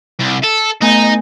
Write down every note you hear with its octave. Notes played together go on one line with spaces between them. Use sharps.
C2
A4
A3 B3 D#4 G#5